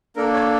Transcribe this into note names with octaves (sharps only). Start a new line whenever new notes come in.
A#3 D4 A4 A#4
C#5